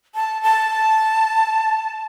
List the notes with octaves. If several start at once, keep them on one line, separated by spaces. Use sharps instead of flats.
A5
A5